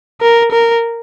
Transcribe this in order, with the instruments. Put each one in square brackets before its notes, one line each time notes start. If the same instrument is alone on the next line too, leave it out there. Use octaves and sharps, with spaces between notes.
[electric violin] A#4
A#4